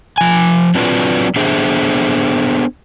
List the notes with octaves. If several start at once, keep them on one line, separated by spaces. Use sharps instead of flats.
F3 G#5
F#3 C4 D4 F4 B4
B3 D4 G#4 A4 C5 E5